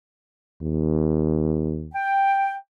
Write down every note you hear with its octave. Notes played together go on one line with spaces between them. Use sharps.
D#2
G5